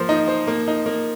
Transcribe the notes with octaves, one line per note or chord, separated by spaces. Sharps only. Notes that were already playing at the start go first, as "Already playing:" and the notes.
Already playing: F3 A#3 C5
D#4
C5
A#3
D#4
A#3